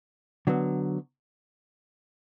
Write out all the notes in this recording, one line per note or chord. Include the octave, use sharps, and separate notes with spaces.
D3 F#3 B3